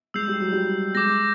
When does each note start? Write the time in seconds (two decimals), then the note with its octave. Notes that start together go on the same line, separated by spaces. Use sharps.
0.14 G#3 E6 G6 C7 F7
0.28 G3
0.40 F#3
0.52 G3
0.95 G#3 D6 G6 A#6